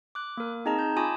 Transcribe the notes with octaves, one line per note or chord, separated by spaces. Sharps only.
D6 F#6
A#3 A#4
C4 D#4 G#4 D#5 A5 A#5
G6
F4 G#5 A5 B5 D6 D#6